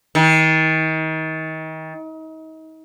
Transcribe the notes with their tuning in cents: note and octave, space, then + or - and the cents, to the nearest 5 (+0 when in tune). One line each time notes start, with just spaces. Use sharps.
D#3 +35